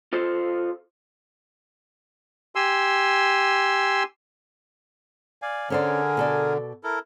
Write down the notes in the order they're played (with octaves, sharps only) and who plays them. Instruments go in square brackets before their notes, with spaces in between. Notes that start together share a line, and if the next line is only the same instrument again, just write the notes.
[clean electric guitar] F4 A4 C5
[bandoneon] G4 G#5 C6 E6
[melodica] D5 F5 G#5
[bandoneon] D3 [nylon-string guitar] C#4 C5 D5 [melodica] G#4 A#4 G#5
[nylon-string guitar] B2 A4 D5
[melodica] E4 A4 A#4